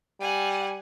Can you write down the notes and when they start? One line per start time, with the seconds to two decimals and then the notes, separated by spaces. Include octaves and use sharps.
0.20 G3 F#5 G#5